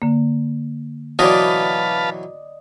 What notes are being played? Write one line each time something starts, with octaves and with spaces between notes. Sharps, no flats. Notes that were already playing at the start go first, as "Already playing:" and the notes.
D3 A#3
B2 E3 F#3 B4 D5 D#5 F5 A5